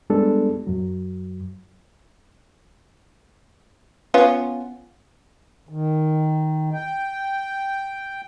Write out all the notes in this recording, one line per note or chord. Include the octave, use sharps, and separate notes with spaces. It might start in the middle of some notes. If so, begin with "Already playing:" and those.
G3 G#3 B3 D4 A4
F#2 F#3
B3 C#4 F4
D#3
G5